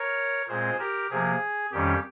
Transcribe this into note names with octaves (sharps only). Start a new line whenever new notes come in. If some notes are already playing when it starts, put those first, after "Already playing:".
Already playing: A#4 C#5
A#2 G#3 C4 G#4 C5
G4 A#4
C3 F3 A#3 G#4
F2 D#3 G3 C#4 G4